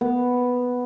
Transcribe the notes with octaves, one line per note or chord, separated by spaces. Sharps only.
B3